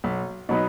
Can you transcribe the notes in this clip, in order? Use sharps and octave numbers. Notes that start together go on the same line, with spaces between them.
B1
B2 F#3 B3 D#4